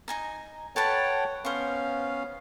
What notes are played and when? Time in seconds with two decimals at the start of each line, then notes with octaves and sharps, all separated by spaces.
0.08 D#4 G#5 A#5
0.76 A4 B4 C#5 F#5 G5 A5
1.45 B3 C#4 C5 F5 C#6